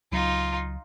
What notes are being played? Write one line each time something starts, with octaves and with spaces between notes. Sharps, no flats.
C#2 F#3 D#4 F4